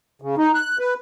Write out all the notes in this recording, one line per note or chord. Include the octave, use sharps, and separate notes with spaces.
C#3
D#4
F#6
B4